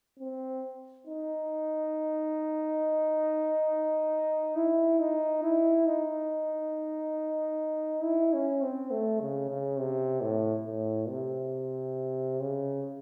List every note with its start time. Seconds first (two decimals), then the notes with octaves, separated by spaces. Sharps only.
0.19 C4
1.07 D#4
4.56 E4
4.99 D#4
5.43 E4
5.86 D#4
8.04 E4
8.33 C#4
8.62 C4
8.91 A3
9.21 C#3
9.49 C#3
9.79 C3
10.21 A2
10.65 A2
11.09 C3
12.40 C#3